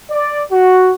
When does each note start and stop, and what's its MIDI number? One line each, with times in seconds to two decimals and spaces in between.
0.10 0.40 74
0.52 0.91 66